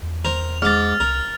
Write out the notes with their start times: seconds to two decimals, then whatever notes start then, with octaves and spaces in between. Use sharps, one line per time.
0.03 E2
0.25 A#4 C5 F7
0.62 G#2 D6 F6 A6
1.00 C2 A#4